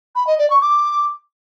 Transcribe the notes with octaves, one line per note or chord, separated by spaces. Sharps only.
B5
D#5
D5
C#6
D6